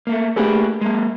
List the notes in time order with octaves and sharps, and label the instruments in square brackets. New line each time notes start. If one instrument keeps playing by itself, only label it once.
[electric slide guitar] A3 A#3
[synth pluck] A3 G#4 [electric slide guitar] A#3 G4 B4
[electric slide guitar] G#3 A#3